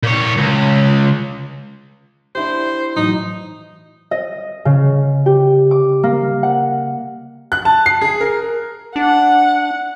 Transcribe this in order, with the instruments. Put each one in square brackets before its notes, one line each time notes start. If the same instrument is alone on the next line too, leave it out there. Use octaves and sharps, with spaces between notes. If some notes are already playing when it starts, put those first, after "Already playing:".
[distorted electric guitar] A#2 C#5
C#2
[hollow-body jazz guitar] D4 E4 G4 [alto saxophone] C5
[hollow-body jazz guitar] A2 E3 F#3 [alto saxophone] D#4
[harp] D#5
C#3
G4
D6
A#3
F#5
[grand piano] F#6
A5
C7
G#4
A#4
[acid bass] D4 [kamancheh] F#5